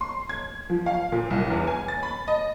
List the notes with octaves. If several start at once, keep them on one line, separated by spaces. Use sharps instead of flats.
C6
G#6
F3
F5
A#2
C2
E2
G#5
A6
B5
D#5